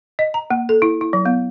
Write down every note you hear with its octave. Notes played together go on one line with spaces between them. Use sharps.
D#5
A#5
A#3
A4
E4
E4
F#3
B3